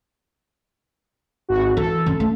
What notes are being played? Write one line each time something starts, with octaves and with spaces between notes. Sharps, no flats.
G#1 F#4
E3 A4
D3 C#4
A3